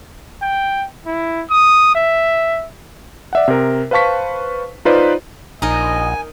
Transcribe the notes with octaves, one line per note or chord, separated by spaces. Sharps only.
G5
E4
D#6
E5
D5 E5 F#5
C3 A#4
B4 C5 F5 A5 C#6 B6
D#4 F4 B4 C5 D5
A#1 D#4 A#4 D#5 G#5